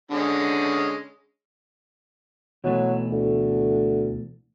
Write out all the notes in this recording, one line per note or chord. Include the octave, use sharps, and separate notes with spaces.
D3 G#3 C#4
B2 E3 F#3 A3
D2